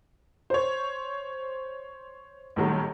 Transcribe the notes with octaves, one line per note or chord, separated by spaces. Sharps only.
C5 C#5
A#1 A2 D#3 F#3 G3